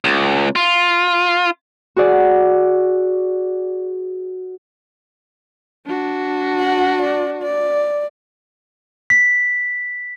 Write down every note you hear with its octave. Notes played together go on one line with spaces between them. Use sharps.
C#2
F4
F#4 G#4 D5
D4 F#4
F#5
D5
D5
B6